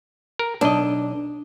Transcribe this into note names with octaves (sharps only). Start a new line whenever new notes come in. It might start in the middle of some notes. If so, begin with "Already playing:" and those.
A#4
B1 D4 D#5